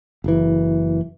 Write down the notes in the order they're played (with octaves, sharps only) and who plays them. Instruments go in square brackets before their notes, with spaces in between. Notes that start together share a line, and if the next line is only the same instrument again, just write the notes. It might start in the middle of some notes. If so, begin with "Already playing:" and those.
[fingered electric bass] F#1 E3